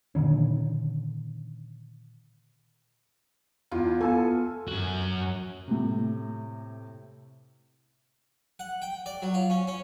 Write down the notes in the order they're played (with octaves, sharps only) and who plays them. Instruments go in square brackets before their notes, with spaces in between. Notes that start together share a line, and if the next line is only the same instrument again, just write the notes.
[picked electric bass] A#2 D3 D#3 C#4
[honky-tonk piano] E2 [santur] F4
[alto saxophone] B3 [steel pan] A4 [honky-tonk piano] G#5
[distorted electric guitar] F#2 F#4
[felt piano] A2 C3
[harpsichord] F#5
G5
D5
F#3
F4
C#4
C#4